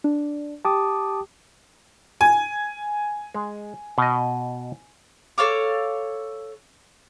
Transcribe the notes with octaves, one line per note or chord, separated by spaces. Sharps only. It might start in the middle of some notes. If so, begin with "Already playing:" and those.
D4
G4 A5 D6 D#6
G#5
G#3
B2 D#5
A4 C#5 F5 D6